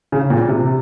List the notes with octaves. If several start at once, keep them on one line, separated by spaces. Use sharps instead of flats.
C#3
A#2
C3